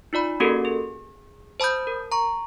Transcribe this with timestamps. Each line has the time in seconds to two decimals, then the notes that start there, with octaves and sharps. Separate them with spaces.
0.13 D#4 F4 D5 B5
0.40 A#3 C#4 F#4 G4 A4 A#4
0.65 G#4
1.60 C5 A5 B5 D#6 G6
1.87 A#4
2.12 A#5 C#6